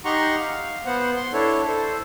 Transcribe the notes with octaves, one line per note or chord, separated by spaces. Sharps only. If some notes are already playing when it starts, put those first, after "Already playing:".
D#4 G4 F#5 A#5 C6 C#6
F5
B3 C5 F#5
C6
D4 E4 A4 C#5
A4 C5